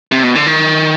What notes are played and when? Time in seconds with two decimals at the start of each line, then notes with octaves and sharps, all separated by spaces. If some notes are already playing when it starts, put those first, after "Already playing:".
0.12 C3
0.23 B2
0.35 D3
0.47 D#3